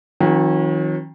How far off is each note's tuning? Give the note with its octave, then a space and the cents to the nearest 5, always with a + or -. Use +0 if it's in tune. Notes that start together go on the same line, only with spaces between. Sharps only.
D#3 +35 F#3 -30 C#4 -25